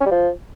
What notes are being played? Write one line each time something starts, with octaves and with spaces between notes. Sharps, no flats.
C#4
G3
F3